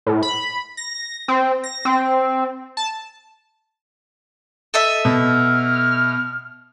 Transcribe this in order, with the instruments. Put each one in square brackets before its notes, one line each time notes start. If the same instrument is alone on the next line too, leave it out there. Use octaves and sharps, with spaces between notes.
[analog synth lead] A2
B5
A#6
C4
A#6
C4
A5
[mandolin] A4 D#5 E5
[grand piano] B2 [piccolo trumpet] F6